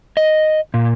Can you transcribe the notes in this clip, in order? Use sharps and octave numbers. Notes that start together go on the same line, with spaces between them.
D#5
A#2